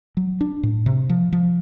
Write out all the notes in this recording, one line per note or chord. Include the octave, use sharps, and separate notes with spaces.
F#3
D4
A2
C3
F3
F3